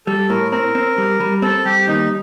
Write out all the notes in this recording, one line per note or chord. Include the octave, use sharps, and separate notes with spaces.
G3 A4
A2 A#4
C4 A#4
C4
G3
G3
C4 A4
G3 G4
D#2 D#4